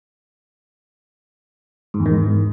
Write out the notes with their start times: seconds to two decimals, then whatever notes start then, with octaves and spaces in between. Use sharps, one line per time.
1.94 G#2
2.00 E2
2.06 D#3
2.12 G#2